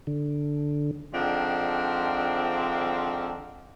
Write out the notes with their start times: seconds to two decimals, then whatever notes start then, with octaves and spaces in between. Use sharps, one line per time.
0.07 D3
1.13 D3 D#3 F3 G#3 C4 D4